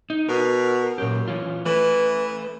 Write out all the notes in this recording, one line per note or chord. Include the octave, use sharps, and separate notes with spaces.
D#4
B2 A#4
F#2 A#2 G4
E3 C#4 F4
E3 A3 B4